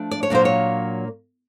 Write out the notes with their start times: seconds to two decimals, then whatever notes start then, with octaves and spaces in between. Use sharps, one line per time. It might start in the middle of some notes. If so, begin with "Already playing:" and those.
Already playing: F3 A3 D4
0.11 D5
0.23 C#5
0.30 A#2 F#3 A#3 D4 C5
0.45 C#5